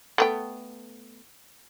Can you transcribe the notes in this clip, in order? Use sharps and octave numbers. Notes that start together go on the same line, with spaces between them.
A3 B3 G5